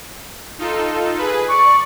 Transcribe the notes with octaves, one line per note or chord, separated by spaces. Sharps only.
D#4 F4 A4
G#4 B4
D5 C#6